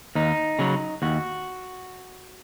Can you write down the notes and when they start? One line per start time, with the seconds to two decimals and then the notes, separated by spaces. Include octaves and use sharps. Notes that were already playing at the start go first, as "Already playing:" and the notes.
0.15 D#2 D#4
0.59 C#3 F#3
1.02 D#2 F#4